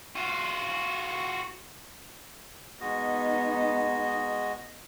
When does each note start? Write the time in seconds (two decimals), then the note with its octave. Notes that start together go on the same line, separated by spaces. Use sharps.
0.16 F4 F#4
2.80 G#3 B3 D#4 F#4 D#5